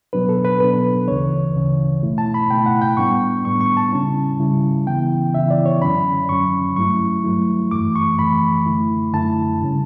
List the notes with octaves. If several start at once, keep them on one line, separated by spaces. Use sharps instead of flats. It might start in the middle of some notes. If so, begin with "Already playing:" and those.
B2 F#3 B3 D4 B4
A4
B4
B2 F#3 B3 D4 B4
D2 C#3 E3 C#5
D2 C#3 E3
B2 A3 E4
A5
B5
B2 A3 E4 G5
F#5
G5
A2 G3 B3 D4 C#6
A2 G3 B3 D4 C#6
C#6
A5
C#3 G3 C#4 E4
C#3 G3 C#4 E4
C#3 E3 B3 E4 G5
C#3 E3 B3 E4 E5
D5
C#5
F#2 D3 F#3 C#4 B5
F#2 D3 F#3 C#4 C#6
G2 F#3 A3 E4 C#6
G2 F#3 A3 E4
F#2 E3 A3 D6
C#6
F#2 E3 A3 B5
F#2 D3 A3 E4
F#2 D3 A3 E4 A5
C#3 G3 C#4